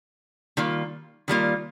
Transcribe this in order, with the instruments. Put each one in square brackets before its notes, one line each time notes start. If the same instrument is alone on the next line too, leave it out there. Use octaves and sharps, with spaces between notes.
[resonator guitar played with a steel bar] D#3 G3 A#3 F4
D#3 G3 A#3 F4